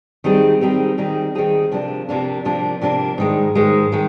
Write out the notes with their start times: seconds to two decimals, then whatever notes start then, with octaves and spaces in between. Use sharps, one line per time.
0.24 D#3 G3 C4 D#4 G#4
0.61 D#3 G3 C4 D#4 G#4
0.98 D#3 G3 C4 D#4 G#4
1.35 D#3 G3 C4 D#4 G#4
1.72 C3 F3 A#3 D4
2.09 C3 F3 A#3 D4
2.45 C3 F3 A#3 D4
2.81 C3 F3 A#3 D4
3.18 G#2 D#3 G#3
3.55 G#2 D#3 G#3
3.92 D#3 G#3